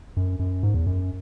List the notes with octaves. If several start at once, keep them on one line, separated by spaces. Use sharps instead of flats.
F#2
F#2
G#2
E2
F#2